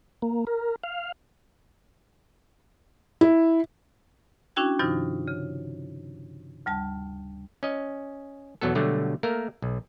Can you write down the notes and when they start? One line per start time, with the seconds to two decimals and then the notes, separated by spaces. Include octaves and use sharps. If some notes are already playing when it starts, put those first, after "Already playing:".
0.22 A#3
0.47 A#4
0.84 F5
3.21 E4
4.56 C#4 D4 E4 F#4 G5 G#6
4.79 G2 C3 D#3 F3 D#4 F4
5.28 C#3
6.66 D2 G3 A5
7.63 C#4 D#5
8.61 E2 B2 F#3 B3 A4
8.75 B2 D3 F#3 G3 A3
9.23 A3 A#3 A#4
9.62 B1